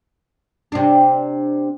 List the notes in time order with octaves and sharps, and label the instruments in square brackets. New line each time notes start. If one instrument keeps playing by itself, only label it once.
[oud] C3 D4